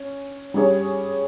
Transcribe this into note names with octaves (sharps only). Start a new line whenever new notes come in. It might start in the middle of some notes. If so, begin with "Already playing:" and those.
Already playing: C#4
G3 C#4 G#4 C#5